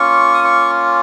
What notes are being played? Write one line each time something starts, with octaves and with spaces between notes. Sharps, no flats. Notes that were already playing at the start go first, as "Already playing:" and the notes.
Already playing: A#3 C#4 F4 C#6
D#6
C#6